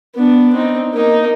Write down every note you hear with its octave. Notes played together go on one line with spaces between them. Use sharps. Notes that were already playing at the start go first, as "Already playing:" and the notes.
B3 D4
C4 D#4
A#3 D#4